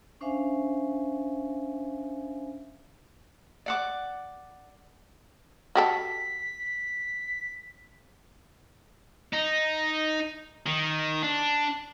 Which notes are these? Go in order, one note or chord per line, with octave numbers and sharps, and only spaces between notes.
C#4 D4 C5 E5 F5 G#5
D5 F#5 D6
F#4 G4 A4 B6
D#4
D#3
D4